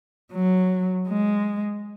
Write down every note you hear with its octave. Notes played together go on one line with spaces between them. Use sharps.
F#3
G#3